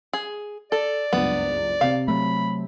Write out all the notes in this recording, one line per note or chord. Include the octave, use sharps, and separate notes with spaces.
G#4
A4 D5
F#1 C#2 G2 B3
C3 C4 F5
F#3 A3 B5